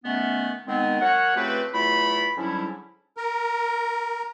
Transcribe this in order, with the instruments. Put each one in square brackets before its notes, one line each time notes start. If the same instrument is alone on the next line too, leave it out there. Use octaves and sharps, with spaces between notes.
[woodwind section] D#3 A3 B3 C#4
D#3 G#3 B3 C4
F#3 F#4 A#4 C#5 F#5
C#3 F3 A3 C4 G4 B4
E2 F#3 A3 E4 F4 B5
G#2 D3 F#3 G3 C#4 E4
[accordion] A#4